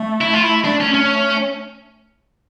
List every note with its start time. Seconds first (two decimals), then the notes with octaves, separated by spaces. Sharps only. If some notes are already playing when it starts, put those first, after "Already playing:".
Already playing: A3
0.21 E4
0.34 F4
0.43 E4
0.64 A3 D4
0.80 C#4
0.94 C#4